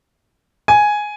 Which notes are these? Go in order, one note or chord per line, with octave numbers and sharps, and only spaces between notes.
G#5